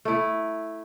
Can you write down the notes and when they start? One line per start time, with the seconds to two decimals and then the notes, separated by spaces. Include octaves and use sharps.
0.05 A3 E4